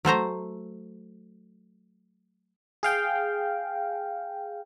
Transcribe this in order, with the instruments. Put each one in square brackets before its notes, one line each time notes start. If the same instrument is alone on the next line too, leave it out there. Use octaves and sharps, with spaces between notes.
[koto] F#3 A3 C5 A#5
[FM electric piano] G#4 F5 G5